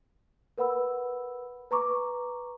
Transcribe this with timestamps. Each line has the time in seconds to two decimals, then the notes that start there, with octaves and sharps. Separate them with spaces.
0.58 A#4 B4 F#5 B5 E6
1.71 B4 A#5 C#6 D6